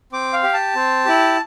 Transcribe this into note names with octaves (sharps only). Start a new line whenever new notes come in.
C4 D6
F5
G4
A5
C4
E4 G4